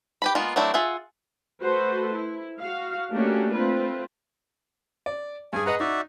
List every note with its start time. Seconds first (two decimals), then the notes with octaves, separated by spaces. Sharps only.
0.22 G4 B4 B5
0.35 G#3 A#3 B3 F4
0.56 F#3 A3 C4 D4 E4
0.74 F4 G#4 E5 F#5
1.63 A3 F#4 A4 B4 C5
2.13 E4
2.60 F#4 F5
3.11 A3 A#3 C#4 D4 F#4 G4
3.54 A3 C4 F4 B4
5.06 D5
5.53 G2 G#4 G#5
5.66 G#4 B4 D#5 F#5 A#5
5.80 D#4 F#4 D5 E5